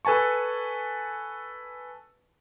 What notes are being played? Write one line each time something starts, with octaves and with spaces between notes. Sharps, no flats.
A4 B4 G#5 A5 C#6